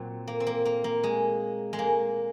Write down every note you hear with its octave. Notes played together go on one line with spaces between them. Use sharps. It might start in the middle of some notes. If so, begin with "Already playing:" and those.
Already playing: A#2 F#3 C4
A#3
C4
A#3
A#3
A#3
G#3
G#3
A#3